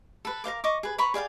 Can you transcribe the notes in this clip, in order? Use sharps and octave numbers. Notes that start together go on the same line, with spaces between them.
A4 B4
A#4 C5 F5 D6
D#5 C#6 D6
G#4 B4
B4 A#5 B5 C#6
G#4 D5 F5 G5